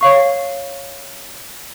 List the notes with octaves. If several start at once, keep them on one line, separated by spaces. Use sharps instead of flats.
C#5 F5 C#6